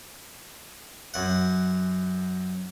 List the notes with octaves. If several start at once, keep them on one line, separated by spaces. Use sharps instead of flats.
F#2 F#5